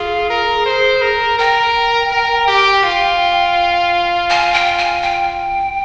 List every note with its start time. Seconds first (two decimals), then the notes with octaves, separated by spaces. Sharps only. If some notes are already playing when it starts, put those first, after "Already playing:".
Already playing: F4 G#4
0.30 A#4
0.66 C5
1.02 A#4
1.39 A#4 G5
2.11 A#4
2.48 G4
2.84 F4
4.30 G#5
4.54 G5
4.78 G#5
5.02 G5